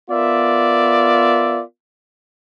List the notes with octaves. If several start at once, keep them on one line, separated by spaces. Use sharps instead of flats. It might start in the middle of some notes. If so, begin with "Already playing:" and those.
B3 F4 A#4 D5 E5